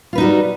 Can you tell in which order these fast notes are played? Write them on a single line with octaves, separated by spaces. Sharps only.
F4 B4 D#4 F#4 G3